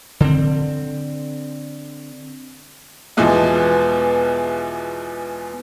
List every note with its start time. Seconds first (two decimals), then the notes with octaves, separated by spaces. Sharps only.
0.20 D3 C4
3.17 E2 B2 E3 F3 G#3